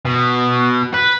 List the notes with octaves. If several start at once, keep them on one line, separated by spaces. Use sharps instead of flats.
B2
B4